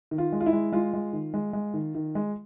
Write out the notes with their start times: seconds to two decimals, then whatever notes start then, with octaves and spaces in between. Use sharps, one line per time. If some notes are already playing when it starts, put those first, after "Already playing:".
0.11 D#3
0.18 F4
0.32 G#3
0.40 F4
0.46 E4
0.53 G#3
0.72 G#3 F4
0.94 G#3
1.13 D#3
1.34 G#3
1.53 G#3
1.74 D#3
1.95 D#3
2.15 G#3